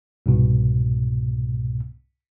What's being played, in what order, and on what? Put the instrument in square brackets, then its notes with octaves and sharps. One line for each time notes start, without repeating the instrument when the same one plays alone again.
[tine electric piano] C2 G#2 B2